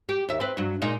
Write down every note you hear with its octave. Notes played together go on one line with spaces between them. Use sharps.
G4
D#2 E5
C4 B4
G2 F#3
A#2 G#3 D#4